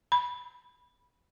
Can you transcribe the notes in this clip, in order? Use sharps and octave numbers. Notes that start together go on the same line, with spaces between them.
B5